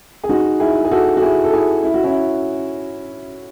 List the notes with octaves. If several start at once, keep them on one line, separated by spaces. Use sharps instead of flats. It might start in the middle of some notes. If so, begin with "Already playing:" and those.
G#4
D#4 F#4
E4 G#4
G#4
F#4 A4
F#4
E4 G#4
A4
E4 G#4
E4
F#4
C#4 E4